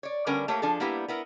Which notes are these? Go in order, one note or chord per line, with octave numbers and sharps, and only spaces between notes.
C#5 D5
D3 G3 B3 C#4 A#4
A3 A#3 G4 C#5
F3 D4 G#4 A4
G3 A#3 B3 E4 G4
B3 E4 A#4